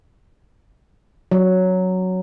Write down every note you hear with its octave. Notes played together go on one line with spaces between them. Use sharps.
F#3